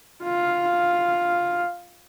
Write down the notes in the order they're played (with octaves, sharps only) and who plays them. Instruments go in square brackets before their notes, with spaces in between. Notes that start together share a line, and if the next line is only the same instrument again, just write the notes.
[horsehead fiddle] F4 F5